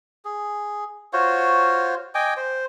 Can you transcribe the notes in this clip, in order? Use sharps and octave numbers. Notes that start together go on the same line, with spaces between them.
G#4
F4 F#4 C5 C#5
D#5 G5 G#5 D6
C5